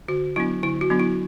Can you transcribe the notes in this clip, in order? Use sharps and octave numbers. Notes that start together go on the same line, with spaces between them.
D3 F#4
F#3 B3 D4 E4
D3 E4
F#4
F#3 B3 D4
E4